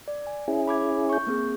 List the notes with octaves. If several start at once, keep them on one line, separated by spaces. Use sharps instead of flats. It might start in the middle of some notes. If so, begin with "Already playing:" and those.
D5
G#5
C#4 E4 G#4
B5 D6 G#6
C#6 G6
A#3 C4 G#4